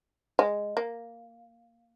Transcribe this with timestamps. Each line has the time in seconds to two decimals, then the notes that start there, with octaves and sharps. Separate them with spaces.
0.39 G#3
0.77 A#3